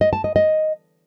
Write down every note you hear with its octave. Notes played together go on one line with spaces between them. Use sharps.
D#5
A5
D#5
D#5